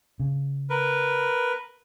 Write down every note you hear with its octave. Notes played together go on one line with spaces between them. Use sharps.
C#3
A#4 B4